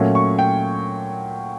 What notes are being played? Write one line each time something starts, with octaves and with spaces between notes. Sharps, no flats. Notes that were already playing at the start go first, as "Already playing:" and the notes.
Already playing: A#2 F#3 A3 C#4
C#6
G5